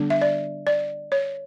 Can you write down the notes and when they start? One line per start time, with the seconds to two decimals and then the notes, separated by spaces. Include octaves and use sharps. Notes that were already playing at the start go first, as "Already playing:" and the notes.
Already playing: D3 G3 B3 D4
0.10 E5
0.22 D5
0.67 D5
1.12 C#5